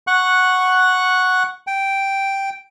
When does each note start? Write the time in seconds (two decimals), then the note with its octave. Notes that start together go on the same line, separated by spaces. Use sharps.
0.07 F#5 C#6 F#6
1.67 G5